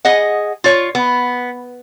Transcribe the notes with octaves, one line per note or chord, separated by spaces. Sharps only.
G#4 D#5 F#5
F4 C#5
B3